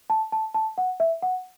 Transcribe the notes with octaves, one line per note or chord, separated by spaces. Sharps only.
A5
A5
A5
F#5
E5
F#5